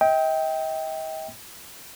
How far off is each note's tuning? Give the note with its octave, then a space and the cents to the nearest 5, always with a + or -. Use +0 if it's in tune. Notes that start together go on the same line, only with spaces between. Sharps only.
D#5 +45 G5 +0